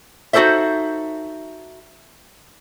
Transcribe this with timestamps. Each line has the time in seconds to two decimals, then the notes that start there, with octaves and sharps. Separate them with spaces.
0.33 D#4 F#4 G4 A4 C5 E5